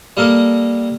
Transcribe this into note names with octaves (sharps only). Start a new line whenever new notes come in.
G3 A#3 A4 A#4 D#6